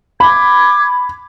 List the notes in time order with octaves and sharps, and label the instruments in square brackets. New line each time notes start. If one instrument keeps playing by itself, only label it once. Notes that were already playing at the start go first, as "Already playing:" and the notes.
[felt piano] B5 [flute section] D6 G#6